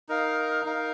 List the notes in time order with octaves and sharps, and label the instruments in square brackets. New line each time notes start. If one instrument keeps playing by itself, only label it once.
[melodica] D#4 A#4 F5
D#4 A#4 F5